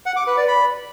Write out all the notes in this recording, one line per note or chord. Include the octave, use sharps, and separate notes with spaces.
F#5
D6
B4
D5
B5